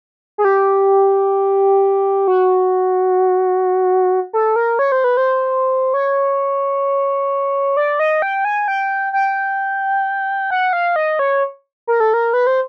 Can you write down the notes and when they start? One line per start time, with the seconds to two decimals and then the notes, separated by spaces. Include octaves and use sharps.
0.38 G#4
0.45 G4
2.28 F#4
4.33 A4
4.56 A#4
4.79 C#5
4.92 C5
5.04 B4
5.17 C5
5.94 C#5
7.77 D5
7.99 D#5
8.22 G5
8.45 G#5
8.68 G5
9.13 G5
10.50 F#5
10.73 F5
10.96 D#5
11.19 C#5
11.87 A#4
12.00 A4
12.14 A#4
12.33 B4
12.47 C5